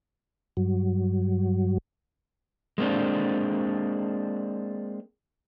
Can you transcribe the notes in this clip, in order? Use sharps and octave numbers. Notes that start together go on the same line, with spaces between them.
G2 F#3
G#3 A#3 C4 D4